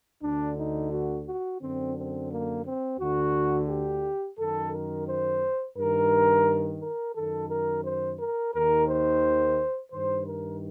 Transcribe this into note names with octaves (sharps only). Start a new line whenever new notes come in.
D2 D3 D4
D#4
F#4
F#4
F#2 D3 C4
C4
A#3
C4
D2 D3 F#4
G4
F#2 D#3 A4
A#4
C5
G2 D#3 A#4
A#4
F#2 D#3 A4
A#4
C5
A#4
D#2 D#3 A#4
C5
G2 D#3 C5
A#4